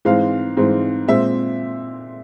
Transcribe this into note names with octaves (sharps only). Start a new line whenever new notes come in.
G#2 E3 G#3 C4 F5
G#2 E3 G#3 C4
A#2 G#3 C4 E5